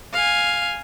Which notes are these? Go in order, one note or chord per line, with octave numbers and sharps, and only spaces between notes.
F5 G#5